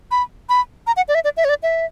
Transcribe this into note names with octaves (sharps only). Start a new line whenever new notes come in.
B5
B5
A#5
F#5
D5
E5
D5
E5
C#5
D5
E5